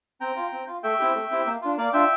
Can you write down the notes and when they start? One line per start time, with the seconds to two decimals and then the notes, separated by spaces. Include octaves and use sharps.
0.21 C4 G5 A#5
0.36 F4
0.52 C4
0.67 F4
0.83 A3 E5 G5
0.99 C4 E4 G4
1.14 A3
1.31 C4 E4 G4
1.46 A#3
1.62 D4 F4
1.77 A#3 D5 F5
1.93 D4 F4 E5 G5